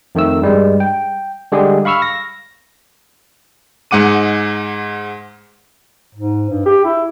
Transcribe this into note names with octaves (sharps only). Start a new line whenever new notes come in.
F2 D#3 A3 E6
G2 G3 G#3
G5
D3 G3 G#3 G4 G#4
F5 B5 C#6 E6 F6
A#6
G#2 G#3 F#5 D6 D#7
G#2
G2
G4
E4